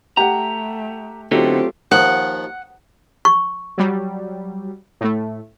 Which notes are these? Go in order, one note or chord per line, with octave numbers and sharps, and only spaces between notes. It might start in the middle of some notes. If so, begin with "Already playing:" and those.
A3 G4 F#5 A#5
D3 F#3 A3 B3 C4 D#4 F4 G4
D#2 D#3 F3 F#5
C#6
F#3 G3
A2 A3